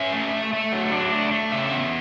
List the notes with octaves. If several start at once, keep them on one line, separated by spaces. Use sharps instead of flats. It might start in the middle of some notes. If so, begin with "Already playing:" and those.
Already playing: C#4 E5
A3
A3
A3
F#3
D4
A3
A3
C#3 E5
B3